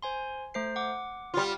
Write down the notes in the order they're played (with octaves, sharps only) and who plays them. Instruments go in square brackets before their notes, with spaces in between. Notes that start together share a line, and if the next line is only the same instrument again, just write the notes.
[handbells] C5 G#5 C6
A3 C5 C7
F#5 D6
[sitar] G3 F4